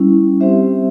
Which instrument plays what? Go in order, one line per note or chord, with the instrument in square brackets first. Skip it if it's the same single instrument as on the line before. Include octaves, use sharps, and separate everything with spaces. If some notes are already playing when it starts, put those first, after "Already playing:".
Already playing: [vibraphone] G3 C#4 E4
G3 C4 G4 C5 E5